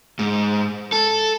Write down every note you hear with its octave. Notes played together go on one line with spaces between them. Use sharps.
G#2
A4